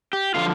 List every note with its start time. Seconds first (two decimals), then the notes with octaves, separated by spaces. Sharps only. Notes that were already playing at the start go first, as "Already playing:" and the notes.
0.13 G4
0.34 D3 F3 F4